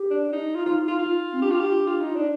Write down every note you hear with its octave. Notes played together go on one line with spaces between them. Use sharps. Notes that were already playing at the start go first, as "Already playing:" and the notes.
Already playing: G4
D4
D#4
D#4 F4
F4
F4
F4
C4
D4 G4
F4
G4
F4
D#4
D4